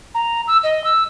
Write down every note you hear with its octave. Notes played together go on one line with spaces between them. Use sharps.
A#5
E6
D#5
E6